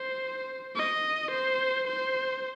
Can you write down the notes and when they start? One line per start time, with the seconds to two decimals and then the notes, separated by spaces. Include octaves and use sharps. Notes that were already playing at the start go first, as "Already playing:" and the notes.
Already playing: C5
0.76 D#5
1.31 C5
1.87 C5